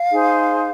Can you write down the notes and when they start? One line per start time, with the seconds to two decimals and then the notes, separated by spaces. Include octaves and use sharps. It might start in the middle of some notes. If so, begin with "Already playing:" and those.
Already playing: F5
0.10 D#4 G#4 C5